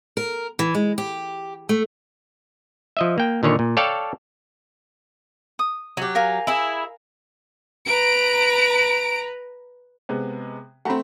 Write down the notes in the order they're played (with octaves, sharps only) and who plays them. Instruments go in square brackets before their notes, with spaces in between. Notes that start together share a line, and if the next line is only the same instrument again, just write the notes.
[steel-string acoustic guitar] A#4
E3
G#3
G4
A3
[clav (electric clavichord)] F3 D#5 E5
A#3 G5
A#2 D3 D#3 C#5
A#2
A4 C#5 D5 F5 G5 A5
[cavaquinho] D#6
[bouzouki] F#3 G4
[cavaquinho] A#4 F5 G#5
[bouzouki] E4 G#4
[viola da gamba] B4 [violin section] A#5 D7
[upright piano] C3 G#3 B3
[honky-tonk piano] A3 C4 [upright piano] F#5 A#5 B5